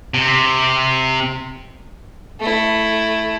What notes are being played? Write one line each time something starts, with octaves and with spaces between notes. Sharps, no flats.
C3
A3 E4